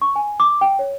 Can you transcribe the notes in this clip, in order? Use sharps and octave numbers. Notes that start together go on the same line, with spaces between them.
C#6
G#5
D6
G5
C#5